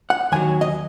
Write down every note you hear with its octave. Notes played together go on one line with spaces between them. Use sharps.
F#5
D#2 D#3 F#3 G#5
D#5